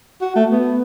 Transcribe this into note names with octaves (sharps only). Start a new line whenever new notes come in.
F#4
A3
B3